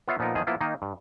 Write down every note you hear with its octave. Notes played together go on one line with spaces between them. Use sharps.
B3 F4 C#5 E5 F5
A#2 F3 B3 D#4 A#4
E2 D#3 F3 G#4 D#5
F3 A#3 B3 E4 F4
D#3 A#3 D#4
G2